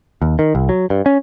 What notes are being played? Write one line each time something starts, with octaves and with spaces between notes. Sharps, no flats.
D#2
D#3
C2
F#3
G2
C#4